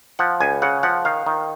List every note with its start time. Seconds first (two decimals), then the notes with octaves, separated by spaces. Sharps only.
0.19 F3 F#5
0.40 C#2 G#5
0.62 C#3 F#5
0.83 F3 F#5
1.05 D#3 F5
1.27 D#3